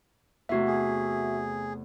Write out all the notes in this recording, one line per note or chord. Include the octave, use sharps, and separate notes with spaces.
E2 C3 A3 F#4 E5
G#4